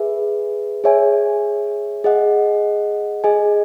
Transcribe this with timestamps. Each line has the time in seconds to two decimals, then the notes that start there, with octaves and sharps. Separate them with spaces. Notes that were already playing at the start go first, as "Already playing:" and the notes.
Already playing: G#4 B4 E5
0.84 G#4 C#5 E5 G#5
2.04 G#4 D#5 F#5
3.24 G#4 D#5 G#5